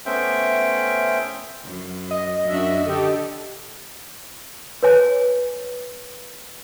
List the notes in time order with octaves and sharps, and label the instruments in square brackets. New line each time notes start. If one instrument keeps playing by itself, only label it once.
[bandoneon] A3 B3 C#4 C5 E5 G5
[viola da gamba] F#2
[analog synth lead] D#5
[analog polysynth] F#2 E5 [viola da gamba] D4 F#4
[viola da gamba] D3 [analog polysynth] G4 A4
[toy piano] B4 C#5 G#5